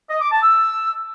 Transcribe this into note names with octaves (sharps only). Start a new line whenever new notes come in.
D#5
D6
A5
E6